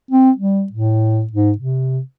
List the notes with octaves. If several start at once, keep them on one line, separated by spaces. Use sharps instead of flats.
C4
G3
A2
G#2
C3